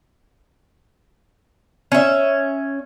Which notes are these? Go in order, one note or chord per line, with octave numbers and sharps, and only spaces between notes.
C#4 E5